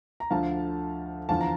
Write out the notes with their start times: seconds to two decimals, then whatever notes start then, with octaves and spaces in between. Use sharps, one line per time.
0.20 A#5
0.31 D2 D3 F3 F5 A5
1.29 E2 D3 F3 F5 A5
1.41 A#5